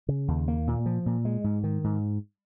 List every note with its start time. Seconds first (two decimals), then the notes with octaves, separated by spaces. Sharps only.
0.09 C#3
0.28 D#2
0.48 A#3
0.67 A#2
0.86 F3
1.06 A#2
1.25 G#3
1.44 G#2
1.64 D#3
1.84 G#2